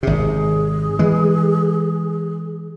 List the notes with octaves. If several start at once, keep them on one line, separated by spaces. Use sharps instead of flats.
G#1 C3 G#4
E3 G#3